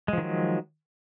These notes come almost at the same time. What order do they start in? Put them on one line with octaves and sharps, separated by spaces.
G#3 F3 D#3 F#3